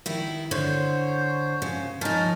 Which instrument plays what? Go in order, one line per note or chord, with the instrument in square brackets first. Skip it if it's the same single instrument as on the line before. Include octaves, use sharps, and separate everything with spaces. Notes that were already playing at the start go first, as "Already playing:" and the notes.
[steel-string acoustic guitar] D#3 E4
[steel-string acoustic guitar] D3 [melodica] C5 C#5
[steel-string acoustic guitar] C#3
[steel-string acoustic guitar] F3 D#4 [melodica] C#4 A#4 A5